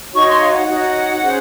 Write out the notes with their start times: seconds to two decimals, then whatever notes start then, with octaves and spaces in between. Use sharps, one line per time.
0.13 D#4 F#4 C#5 C#6
0.28 C6
0.41 F5
0.54 F#5
0.68 D#4 F#4 C#5 F#5
1.22 C#4 G#4 C5